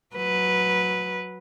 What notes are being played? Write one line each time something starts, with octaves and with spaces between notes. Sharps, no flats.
F#3 B4